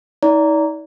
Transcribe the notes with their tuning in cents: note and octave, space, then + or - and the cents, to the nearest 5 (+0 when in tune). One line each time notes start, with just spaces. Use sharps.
D#4 +40 D5 -30 A#5 -5